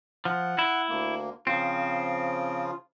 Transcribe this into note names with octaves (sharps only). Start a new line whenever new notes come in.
F3 F#5
E4
D2 A#3
C#3 F3 C4 F4